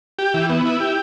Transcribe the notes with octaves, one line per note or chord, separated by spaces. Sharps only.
G4
E3
B3
E4
G4